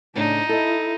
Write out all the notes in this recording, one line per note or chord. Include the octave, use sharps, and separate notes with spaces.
A2 C#3 D4 D#4 C#5
E4 A4 D#5